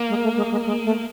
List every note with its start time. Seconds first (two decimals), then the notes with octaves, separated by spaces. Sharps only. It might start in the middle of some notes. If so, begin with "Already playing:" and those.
Already playing: A#3
0.09 G#3
0.23 A3
0.37 G#3
0.51 G#3
0.66 G#3
0.85 A3